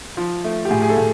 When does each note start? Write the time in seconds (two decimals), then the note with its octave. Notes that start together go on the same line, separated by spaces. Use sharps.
0.17 F3
0.44 A3
0.65 G4
0.71 A2 G#4
0.82 G#4
0.89 A4
0.97 A2